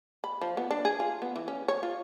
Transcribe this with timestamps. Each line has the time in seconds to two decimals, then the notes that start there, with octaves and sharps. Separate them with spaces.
0.24 B5
0.41 F3
0.57 B3
0.71 D4
0.85 G#4
1.00 F4
1.22 B3
1.36 E3
1.48 C#4
1.68 C#5
1.83 F4